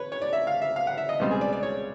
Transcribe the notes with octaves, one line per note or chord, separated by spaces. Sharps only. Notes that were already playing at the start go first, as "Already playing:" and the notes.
Already playing: B4 C#5
C#5
D5
E5
F5
E5
F5
F#5
E5
D#5
C#2 B2 G3 C4
G#4
D5
D5
C#5